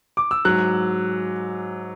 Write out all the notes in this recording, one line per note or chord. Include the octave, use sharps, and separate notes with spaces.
D6
E6
G#2 F#3 F#6